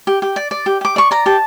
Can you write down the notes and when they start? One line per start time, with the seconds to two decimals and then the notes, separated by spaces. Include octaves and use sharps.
0.07 G4
0.22 G4
0.36 D5
0.51 D5
0.66 G4
0.81 G4 D6
0.96 D5 C#6
1.11 D5 A#5
1.26 G4 A5